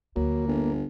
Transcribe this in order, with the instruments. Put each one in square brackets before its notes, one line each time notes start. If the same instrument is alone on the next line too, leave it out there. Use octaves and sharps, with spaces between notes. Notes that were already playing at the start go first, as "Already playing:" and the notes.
[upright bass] D2 [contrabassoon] F#3 [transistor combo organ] A#3
[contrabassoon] G1